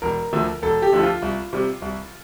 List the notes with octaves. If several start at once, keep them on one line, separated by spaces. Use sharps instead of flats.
E1 A#4
D2 D3 F3
E1 A4
G4
D2 D3 F3
F4
C2
C3 G3
C2